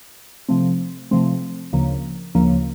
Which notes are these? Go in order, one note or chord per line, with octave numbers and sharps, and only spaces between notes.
C3 F3 A3 C4
C3 F3 A3 C4
D2 C#3 F3 A#3
D2 C#3 F3 A#3